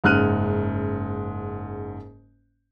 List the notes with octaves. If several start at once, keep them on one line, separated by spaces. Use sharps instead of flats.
F#1 G#2 C#3 F6 F#6 D#7